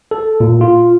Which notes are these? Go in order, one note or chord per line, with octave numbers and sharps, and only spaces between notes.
A4
A#2
F4